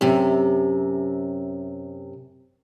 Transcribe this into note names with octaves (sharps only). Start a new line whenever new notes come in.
F#2 C3